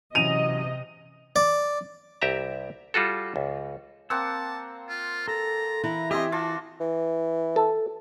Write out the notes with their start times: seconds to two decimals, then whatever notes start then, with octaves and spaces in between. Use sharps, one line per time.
0.15 C3 E3 F#3 C#4 D#5 D#7 F7
1.36 D5
2.22 C2 G4 E5 A#5
2.94 G3 F4 F#4 A4
3.36 C#2
4.10 A#3 C4 F#5 A5 E6
4.89 F4
5.28 A4 A#5
5.83 E3 E4 A#5
6.11 C4 G4 D#5 E5 G#5 C6
6.32 F4 F#4 A5 D6
6.80 E3
7.56 A4